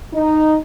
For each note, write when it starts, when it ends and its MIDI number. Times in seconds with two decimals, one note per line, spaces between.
0.13 0.56 63